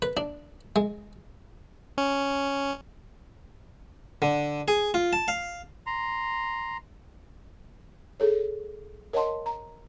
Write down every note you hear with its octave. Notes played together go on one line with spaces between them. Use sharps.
B4
D4
G#3
C#4
D3
G#4
F4
A5
F5
A#5 C6
G#4 A4 C#5
A#4 C#5 D#5 F#5 A5 C6
A#5